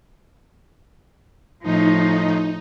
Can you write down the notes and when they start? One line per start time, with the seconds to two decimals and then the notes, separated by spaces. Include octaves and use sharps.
1.63 A2 F3 D#4